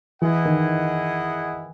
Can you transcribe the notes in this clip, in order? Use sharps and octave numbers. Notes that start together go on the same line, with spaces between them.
E3 E4 G#4 D#5 F#5
D#3